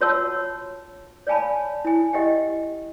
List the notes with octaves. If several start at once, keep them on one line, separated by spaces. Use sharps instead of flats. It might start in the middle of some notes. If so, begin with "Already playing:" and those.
F4 F#4 C#5 F#5 A5 E6
C#5 D5 F5 G#5 A5 B5
E4 G#5
G4 D#5 E5 F#5 G5